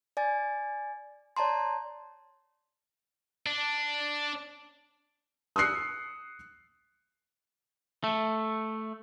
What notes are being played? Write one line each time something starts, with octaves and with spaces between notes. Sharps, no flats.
D5 G#5 A6
C#5 D5 A5 A#5 C6
D4
D#6 E6 F#6 C7 C#7
A3